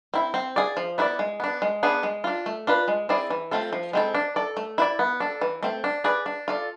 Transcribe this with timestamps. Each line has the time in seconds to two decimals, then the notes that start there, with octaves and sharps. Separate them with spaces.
0.14 C4 E4
0.34 C4
0.56 G#4 D5
0.77 F3
0.98 B3 E4 B4 D5
1.19 G#3
1.40 B3 D4
1.62 G#3
1.83 B3 D4 G#4
2.03 G#3
2.24 D4 F4
2.46 A3
2.67 D4 F4 B4
2.88 G#3
3.09 C4 E4 G#4 D5
3.30 E3
3.51 A3 C4 F4 A4
3.73 F3
3.93 G#3 C4 E4 A4
4.15 D4
4.36 A4 D5
4.57 A3
4.78 E4 B4 D5
4.99 B3
5.20 D4 A4
5.41 E3
5.63 A3 C4
5.84 D4
6.04 G#4 B4 D5
6.26 D4
6.48 F4 A4 D5